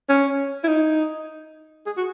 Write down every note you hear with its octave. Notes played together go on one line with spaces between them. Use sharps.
C#4
E4
D#4
G#4
F#4